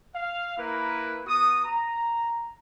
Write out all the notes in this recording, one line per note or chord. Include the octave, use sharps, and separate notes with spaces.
F5
A#3 E4 A#4 B4
B3 F#4 D#6
A#5